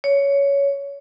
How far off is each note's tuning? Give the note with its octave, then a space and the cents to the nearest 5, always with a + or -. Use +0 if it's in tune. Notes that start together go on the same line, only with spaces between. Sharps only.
C#5 +15